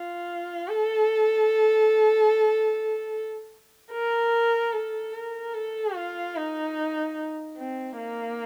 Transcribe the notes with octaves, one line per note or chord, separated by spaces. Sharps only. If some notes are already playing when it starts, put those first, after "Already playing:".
Already playing: F4
A4
A#4
A4
A#4
A4
F4
D#4
C4
A#3